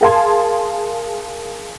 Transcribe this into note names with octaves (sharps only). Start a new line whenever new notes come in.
G#4 A#4 F5 A5 C6 G#6